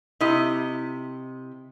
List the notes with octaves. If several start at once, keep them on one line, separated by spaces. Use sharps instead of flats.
C3 E4 D#5